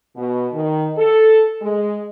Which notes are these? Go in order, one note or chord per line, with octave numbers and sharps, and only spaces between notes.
B2
D#3
A4
G#3